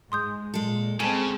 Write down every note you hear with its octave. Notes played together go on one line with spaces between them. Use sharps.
G#2 G#3 C6 D#6 G6
A#2 G#3 A4
C#3 G#3 C4 A4 G#5 A5